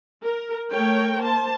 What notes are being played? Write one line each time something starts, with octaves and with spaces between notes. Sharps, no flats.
A#4
A3 A#4 C#5 G5
A#3 C5 A5